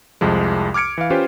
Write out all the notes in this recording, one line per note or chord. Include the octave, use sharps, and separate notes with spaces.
C2 F2 F3 G#3
D6 F6 G#6 C#7 D7
E3 F5
C#4 F4 G4 B4 C5